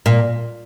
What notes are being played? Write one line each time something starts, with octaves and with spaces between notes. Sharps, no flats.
A#2